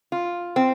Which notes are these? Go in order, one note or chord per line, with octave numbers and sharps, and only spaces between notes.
F4
C4